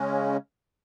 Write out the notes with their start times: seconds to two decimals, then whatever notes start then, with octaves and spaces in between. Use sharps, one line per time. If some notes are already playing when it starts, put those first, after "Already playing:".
Already playing: C#3 G#3 C#4